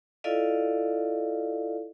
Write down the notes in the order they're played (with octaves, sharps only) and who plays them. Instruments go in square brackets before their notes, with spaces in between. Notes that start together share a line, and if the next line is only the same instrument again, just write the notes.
[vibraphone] E4 F4 A4 D5 D#5 F5